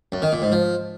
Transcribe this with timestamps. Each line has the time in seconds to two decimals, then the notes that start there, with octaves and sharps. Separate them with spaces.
0.12 F#2
0.22 D#3
0.32 A#2
0.42 G#2
0.52 F3